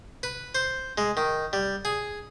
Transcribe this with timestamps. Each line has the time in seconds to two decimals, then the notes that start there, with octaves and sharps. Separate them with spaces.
0.23 B4
0.55 C5
0.98 G#3
1.17 D#3
1.53 G3
1.85 G#4